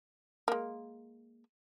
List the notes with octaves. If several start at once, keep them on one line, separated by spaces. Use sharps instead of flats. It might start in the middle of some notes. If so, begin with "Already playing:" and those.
G#3 A#3